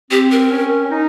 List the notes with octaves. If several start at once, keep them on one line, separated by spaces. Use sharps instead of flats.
C4 G4
A#4
C#4
C#4
D#4